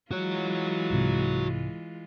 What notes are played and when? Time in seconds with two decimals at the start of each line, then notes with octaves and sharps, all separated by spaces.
0.11 E3 G#3 F4 F#4 C#5
0.90 C2 G#2 C3